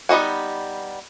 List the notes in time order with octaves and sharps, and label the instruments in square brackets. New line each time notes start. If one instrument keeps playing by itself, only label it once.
[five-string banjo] G3 B3 D#4 F#4 F#5